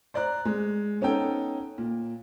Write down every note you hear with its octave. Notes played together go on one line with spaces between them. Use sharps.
C5 D5 A#5 F#6
G#3
B3 C#4 D#4 A4 G5
A#2